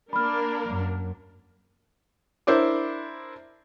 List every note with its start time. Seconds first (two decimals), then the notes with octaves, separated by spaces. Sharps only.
0.13 A#3 D4 A#4 B5 F6
0.66 F#2
2.47 D4 E4 A#4 C5 D5 D6